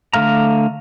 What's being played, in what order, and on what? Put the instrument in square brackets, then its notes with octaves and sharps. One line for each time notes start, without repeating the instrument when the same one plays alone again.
[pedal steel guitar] D3 A3 F5 A#5